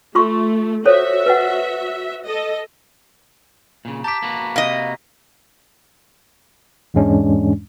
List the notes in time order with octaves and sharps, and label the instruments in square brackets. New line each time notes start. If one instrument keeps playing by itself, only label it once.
[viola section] A3 [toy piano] F4 C6 C#6
[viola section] F#4 E5 [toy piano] A4 C5 C#5
[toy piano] B4 D#5 F#5
[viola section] A4 D#5
[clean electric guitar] A#2 C#3
[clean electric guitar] G4 [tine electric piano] A5 D6 [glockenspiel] A#5 B6
[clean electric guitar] A#3 F#4 B4
[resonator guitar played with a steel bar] C3 D#5 [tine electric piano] F5
[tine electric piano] E2 G#2 E3 G#3 C#4 D4